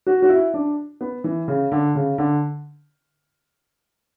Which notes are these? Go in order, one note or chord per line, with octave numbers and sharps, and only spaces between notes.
F#4
F#4
E4
D4
B3
E3
C#3
D3
C#3
D3